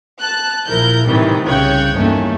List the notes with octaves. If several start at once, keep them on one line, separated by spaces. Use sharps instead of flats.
A5 F#6
A#1 F3 E4 A#4 G6
A2 C3 D#3 E3 G3
C2 C#3 C#5 G5 F#6 G#6
E2 G2 D#3 A3 A#3 C#4